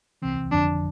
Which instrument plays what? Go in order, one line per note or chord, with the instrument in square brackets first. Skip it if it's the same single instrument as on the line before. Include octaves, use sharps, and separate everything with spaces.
[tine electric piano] C2 C3 E3 [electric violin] C4
[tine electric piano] G1 F2 D3 F3 [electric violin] D4